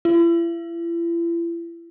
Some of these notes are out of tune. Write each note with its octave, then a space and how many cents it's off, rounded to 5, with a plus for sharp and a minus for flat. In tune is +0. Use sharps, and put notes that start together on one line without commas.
E4 +40